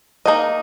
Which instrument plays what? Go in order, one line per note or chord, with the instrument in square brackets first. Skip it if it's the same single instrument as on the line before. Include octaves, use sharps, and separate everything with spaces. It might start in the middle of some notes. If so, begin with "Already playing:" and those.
[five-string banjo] A#3 D#4 G#4 D#5